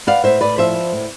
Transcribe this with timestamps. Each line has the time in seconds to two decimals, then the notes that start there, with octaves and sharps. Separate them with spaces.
0.07 B3 D5 F5
0.24 A2 C5 E5
0.41 A2 B4 D5
0.58 F3 C5 E5
0.75 B3
0.92 A2